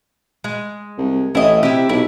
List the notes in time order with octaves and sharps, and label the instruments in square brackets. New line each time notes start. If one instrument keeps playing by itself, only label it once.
[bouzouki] G#3
[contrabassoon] C2
[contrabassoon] A1 [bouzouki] E4 D#5
[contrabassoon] C3 [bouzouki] E4 G4
[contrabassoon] B1 [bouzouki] E4